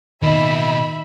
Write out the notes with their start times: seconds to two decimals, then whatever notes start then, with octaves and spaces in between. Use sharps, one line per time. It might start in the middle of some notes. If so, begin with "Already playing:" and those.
0.22 B2 D#3 A#3 D#5 E5 B5